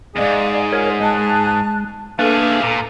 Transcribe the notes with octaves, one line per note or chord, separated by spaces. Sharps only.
E2 G#2 G#4 D5 D#5 F5
F4 A#4 C#5
G#3 A5 F#6
A3 A#3 D4 G#4 A4 B4 F5 D6
A#2 A#5